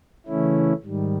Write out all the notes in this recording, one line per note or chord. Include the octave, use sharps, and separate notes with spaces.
C#3 E3 A3 C#4 E4
G#2 D#3 G3